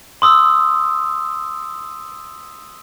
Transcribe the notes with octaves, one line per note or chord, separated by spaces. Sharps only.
C6 D#6 E6